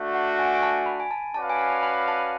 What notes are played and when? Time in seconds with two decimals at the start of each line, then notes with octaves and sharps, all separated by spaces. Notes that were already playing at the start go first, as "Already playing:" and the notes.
Already playing: A3 D4 F#4
0.15 F#5
0.39 G#5
0.54 G#5
0.63 A5
0.86 B5
1.00 G#5
1.11 A5
1.34 C#4 F#4 B4 D5 F5 A5
1.50 G#5
1.59 A5
1.83 B5
2.08 A5